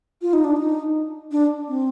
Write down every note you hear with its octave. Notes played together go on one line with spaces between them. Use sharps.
F4
D#4
D4
D#4
D4
C4